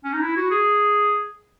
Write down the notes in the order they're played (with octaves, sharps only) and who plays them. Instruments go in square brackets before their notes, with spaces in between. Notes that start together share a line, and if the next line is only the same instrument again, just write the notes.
[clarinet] C#4
D#4
E4
F#4
G#4